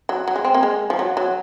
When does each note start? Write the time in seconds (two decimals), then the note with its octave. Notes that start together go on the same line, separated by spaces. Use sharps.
0.09 F#3
0.28 F#3
0.36 G#3
0.45 C4
0.54 A#3
0.63 G#3
0.90 F3
0.99 F#3
1.17 F#3